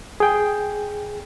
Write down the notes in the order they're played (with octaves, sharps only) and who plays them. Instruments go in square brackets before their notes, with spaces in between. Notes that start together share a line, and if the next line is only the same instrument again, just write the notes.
[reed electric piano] G#4 G5